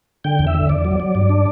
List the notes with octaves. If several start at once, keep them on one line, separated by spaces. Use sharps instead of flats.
D3 G5
E2
E5
D3
E2 D5
F#3
F#3
G2
D4